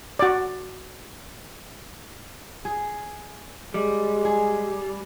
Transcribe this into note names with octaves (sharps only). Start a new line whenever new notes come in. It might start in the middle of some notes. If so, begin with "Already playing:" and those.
F#4 D5
G#4
G3 G#3
G#4